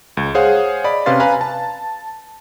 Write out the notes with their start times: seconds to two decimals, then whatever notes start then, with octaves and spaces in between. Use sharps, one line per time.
0.17 C#2
0.35 G#4 C5 C#5 F5 F#5
0.84 D5 D#5 B5
1.06 C3 C#4 B4 F5 C6 A6
1.20 B4 F5 G#5 A#5 B5
1.41 A5